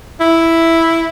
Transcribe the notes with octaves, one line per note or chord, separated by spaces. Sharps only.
E4